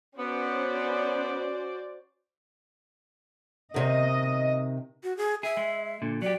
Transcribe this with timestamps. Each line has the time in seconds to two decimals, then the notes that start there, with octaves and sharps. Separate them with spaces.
0.19 B3 C#4 F#4 C5 D5
3.74 C3 D#3 D#5
5.03 F#4
5.17 G#4
5.43 G#4 E5
5.57 G#3
6.02 A#2 D3
6.22 F#3 G4 D5